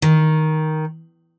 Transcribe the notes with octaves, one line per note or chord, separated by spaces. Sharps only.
D#3